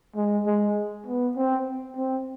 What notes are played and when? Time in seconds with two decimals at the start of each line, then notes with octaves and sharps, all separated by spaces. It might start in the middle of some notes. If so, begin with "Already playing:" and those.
0.16 G#3
0.46 G#3
1.06 B3
1.36 C4
1.97 C4